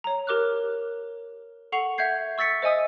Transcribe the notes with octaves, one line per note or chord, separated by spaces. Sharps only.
C#5 A#5
G4 A#4 D6 F6 F#6
A4 F#5 C#6 C7 F7
E5 F#5 G6 G#6 C7
C#6 E6 A6 B6 C#7
C5 D#5 E5 G#5 D#6 E6